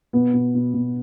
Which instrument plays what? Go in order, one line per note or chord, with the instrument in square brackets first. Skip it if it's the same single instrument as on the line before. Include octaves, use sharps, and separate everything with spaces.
[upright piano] B2 B3
B2
B2
B2